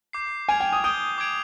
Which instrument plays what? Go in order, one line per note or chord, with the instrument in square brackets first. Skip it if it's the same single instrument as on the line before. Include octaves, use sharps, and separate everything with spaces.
[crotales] D6 G6 C7
[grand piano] G#5 [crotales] F6 G#6 D7 F7
[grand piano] G5
D#6
[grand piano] D#6 [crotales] G6 D7 G7
[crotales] D6 G#6 D7 F7